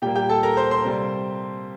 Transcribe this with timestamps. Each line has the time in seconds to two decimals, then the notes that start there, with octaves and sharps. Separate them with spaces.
0.02 A#2 G3 A#3 G4 G5
0.15 G4 G5
0.29 A4 A5
0.43 A#4 A#5
0.57 C5 C6
0.71 C5 C6
0.85 C3 G3 A#3